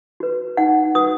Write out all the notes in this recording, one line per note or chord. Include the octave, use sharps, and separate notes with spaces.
F#4 B4
D#4 F#5
F#4 B4 D#6